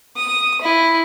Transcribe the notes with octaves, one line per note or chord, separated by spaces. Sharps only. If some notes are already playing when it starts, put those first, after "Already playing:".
D#6
E4